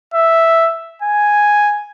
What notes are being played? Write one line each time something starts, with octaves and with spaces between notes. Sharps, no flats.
E5
G#5